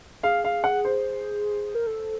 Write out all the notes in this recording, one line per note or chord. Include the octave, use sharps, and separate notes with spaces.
G#4 F5
F5
F#5
C5
A#4
A4